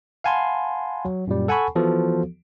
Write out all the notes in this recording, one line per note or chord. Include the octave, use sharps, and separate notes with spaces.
F5 F#5 G#5 A5 B5 C6
F#3
F#2 A#2 G3
A4 F#5 G#5 A5 B5 C#6
E3 F3 B3 F#4 A4